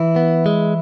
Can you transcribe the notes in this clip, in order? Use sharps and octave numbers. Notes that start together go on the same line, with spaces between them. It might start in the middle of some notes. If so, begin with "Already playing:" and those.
Already playing: E3 E4
B3
G#3